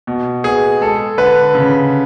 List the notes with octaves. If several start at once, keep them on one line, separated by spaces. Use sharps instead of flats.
B2
B3 G#4
G#3 A4
D3 B4
C#3